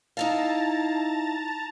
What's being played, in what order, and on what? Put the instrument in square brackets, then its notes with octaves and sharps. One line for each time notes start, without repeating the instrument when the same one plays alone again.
[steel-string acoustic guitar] D#4 E4 F5 [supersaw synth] A5 A#5 A6